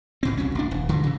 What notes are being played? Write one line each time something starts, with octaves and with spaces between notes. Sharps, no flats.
G#1 B2 C4
F#1 C2 F#3 C#4
A1 D4
D#1
G2 D3
C#3 E3